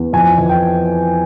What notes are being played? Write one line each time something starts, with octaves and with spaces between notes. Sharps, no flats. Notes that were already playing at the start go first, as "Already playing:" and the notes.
Already playing: E2
F2 G#5
E3
G5